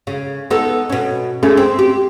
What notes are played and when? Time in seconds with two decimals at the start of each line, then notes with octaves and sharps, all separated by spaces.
0.07 C#3
0.50 B3 D#4 A4
0.90 B2 C#4
1.43 G#3 A3 C#4
1.57 C4
1.79 G4